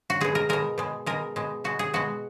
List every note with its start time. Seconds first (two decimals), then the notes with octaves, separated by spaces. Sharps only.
0.10 F#4
0.21 B2 G#3 G#4
0.35 A#4
0.49 B2 G#3 A#4
0.78 B2 G#3
1.06 B2 G#3 A#4
1.36 B2 G#3
1.64 B2 G#3 F#4
1.79 G#4
1.93 B2 G#3 F#4